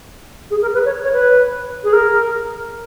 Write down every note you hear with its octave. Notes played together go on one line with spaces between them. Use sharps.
G#4
A#4
B4
C#5
C#5
B4
G#4
A#4